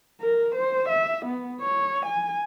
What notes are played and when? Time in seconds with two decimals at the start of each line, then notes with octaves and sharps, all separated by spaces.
0.21 A#4
0.55 C5
0.89 E5
1.25 B3
1.61 C#5
2.06 G#5